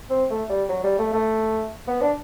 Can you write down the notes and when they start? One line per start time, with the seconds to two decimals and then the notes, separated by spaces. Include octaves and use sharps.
0.10 C4
0.30 A3
0.50 G3
0.69 F#3
0.84 G3
0.99 A3
1.13 A3
1.88 B3
2.01 D4